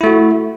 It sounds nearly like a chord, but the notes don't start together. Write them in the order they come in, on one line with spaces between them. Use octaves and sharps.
E4 A3 F#4